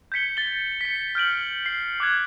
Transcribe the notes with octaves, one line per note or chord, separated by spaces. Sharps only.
G6 G#6 B6 C#7 G7
A6 G7
B6 C#7
F6 G6 D7 F#7
C7
D6 F#6 G#6